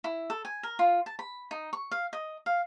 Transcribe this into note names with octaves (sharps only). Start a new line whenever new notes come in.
E4
A4
G#5
A#4
F4
A5
B5
D#4
C#6
F5
D#5
F5